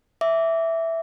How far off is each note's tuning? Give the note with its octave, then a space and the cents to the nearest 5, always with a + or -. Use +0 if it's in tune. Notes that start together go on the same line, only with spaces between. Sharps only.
E5 +0 D6 -20